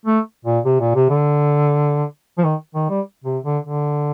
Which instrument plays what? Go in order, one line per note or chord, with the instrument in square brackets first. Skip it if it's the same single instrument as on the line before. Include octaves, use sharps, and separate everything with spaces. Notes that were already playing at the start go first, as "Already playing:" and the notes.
[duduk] A3
A#2
C3
A#2
C3
D3
F3
D#3
D#3
G3
C3
D3
D3